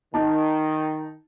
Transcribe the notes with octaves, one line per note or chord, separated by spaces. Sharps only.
D#3 D#4 A5